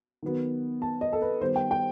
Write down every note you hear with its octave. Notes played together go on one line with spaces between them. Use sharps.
D#3 F#3 B3
A5
D#5
A4
B4
D#3 G3 B3 C5
G5
G5